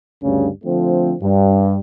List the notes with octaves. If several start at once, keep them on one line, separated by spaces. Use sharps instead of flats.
D2 G2 C#3
D3 F3 A3 C4
G2